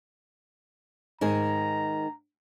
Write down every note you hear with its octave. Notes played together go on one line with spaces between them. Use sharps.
G#2 D#3 G#4 A#5